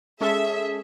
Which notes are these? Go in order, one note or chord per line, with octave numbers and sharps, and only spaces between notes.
G#3 C#4 G#4 A4 E5